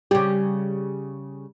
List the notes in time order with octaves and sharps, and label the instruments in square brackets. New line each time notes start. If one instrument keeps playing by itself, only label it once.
[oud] C#3 G3 [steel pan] G4